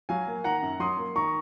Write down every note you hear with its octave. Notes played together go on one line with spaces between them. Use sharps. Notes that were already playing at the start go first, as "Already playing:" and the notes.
F#3 F5 G#5
A#3
D#3 F#5 A#5
F#2
F#3 C6 D#6
A#3
D#3 A#5 C#6